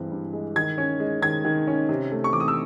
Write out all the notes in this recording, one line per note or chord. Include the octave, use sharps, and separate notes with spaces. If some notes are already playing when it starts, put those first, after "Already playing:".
Already playing: G2 E3 G#3 C4
G2
G#3
D#3 G#6
C#4
G#3
D#3 G#6
D#3
C#4
C3
A3
C#6
E3 D6
D#6
E6